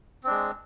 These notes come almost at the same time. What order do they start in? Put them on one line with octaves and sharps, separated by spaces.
C4 D4 G#3